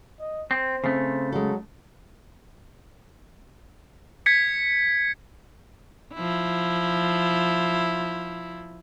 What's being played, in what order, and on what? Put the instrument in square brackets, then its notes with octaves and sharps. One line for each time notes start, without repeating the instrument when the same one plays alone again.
[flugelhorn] D#5
[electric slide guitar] C4 [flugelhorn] C5
[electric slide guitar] C#3 A3 [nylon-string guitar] C4
[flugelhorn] F#3 [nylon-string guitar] G#3 A4
[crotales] G#6 B6 C#7
[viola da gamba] F3 E4